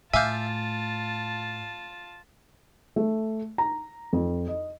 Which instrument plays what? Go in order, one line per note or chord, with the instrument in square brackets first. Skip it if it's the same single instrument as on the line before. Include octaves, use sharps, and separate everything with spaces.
[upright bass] A2 [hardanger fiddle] F4 A5 [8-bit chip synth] E5 F5 [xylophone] G#5 D6 G6
[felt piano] A3
A#5
F2
D#5